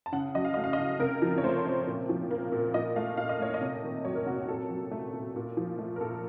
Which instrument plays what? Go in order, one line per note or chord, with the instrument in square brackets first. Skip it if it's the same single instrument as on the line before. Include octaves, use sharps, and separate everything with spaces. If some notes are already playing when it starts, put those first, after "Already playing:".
[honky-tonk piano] A5
C#3 F#5
F#3 D#5
F5
A3 D#5
F5
D#5
C#3
C3 A#4
F3
C#5
A3 C5
C3
A#2
F3
A#3
A#2
A#2 D#5
A3 F5
A#2 F5
D#5
A3 C#5
D#5
C3
D#3
F#3 C#5
A#4
C3 F#4
F#4
A#2 A4
F#3
A3
A#2
A#2
F3
A3
A#4
A#2 A4